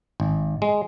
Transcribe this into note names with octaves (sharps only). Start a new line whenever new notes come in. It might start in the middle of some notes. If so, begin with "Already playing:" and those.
G#1
G#3